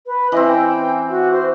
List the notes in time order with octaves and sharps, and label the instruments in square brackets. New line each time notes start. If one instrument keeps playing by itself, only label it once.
[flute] B4
[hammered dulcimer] E3 C4 [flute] D#5
[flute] G5
F#4
C5